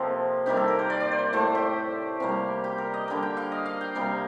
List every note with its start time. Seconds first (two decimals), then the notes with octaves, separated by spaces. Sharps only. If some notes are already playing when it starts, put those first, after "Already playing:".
Already playing: C3 F3 A#3 A4 C5 D#5
0.46 C3 D#3 G3 A#3 G4
0.57 A4
0.68 A#4
0.79 C5
0.90 D5
1.00 D5
1.12 C5
1.33 A2 A3 C5
1.55 G4
2.20 C3 G3 A#3
2.64 G4
2.78 A#4
2.94 D#5
3.08 D3 G3 A#3 G5
3.23 G5
3.37 F5
3.52 D#5
3.66 F5
3.81 G5
3.95 C3 G3 A#3